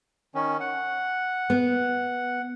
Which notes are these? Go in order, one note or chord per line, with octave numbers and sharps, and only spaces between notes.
D#3 C#4
F#5
B3